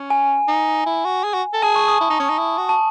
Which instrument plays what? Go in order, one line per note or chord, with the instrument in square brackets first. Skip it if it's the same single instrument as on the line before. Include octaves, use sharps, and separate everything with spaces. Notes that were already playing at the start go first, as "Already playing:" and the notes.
Already playing: [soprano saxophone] C#4
[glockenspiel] G#5
[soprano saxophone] D#4
E4
F#4
G#4
F#4
A4
[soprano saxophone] G#4 [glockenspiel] A5
[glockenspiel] C#6
D#6
[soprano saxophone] E4
D#4
C#4
D#4
E4
F#4
[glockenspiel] A5